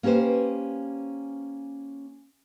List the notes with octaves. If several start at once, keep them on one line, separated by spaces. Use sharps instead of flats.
A#3 C#4 G4 B4 C5